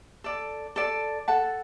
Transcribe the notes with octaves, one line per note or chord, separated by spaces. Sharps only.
A4 D5 A5
A4 D5 A5
A4 F#5 A5